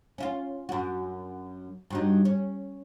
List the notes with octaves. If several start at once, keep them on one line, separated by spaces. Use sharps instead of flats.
C#4 E4 F4
F#2 F#4
G2 F#3 D#4
C#4